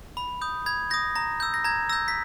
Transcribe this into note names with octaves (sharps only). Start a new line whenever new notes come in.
B5
D#6 G6
B5 G#6
D#6 G6 A#6
A#5 A#6
E6 G6
A#6
A#5 G#6
E6 G6 A#6
B6